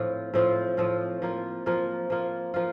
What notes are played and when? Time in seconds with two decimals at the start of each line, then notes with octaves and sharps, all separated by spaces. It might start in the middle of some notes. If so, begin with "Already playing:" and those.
Already playing: A2 F3 C4 F4
0.34 A2 F3 C4 F4
0.77 A2 F3 C4 F4
1.22 F3 A#3 F4
1.66 F3 A#3 F4
2.10 F3 A#3 F4
2.54 F3 A#3 F4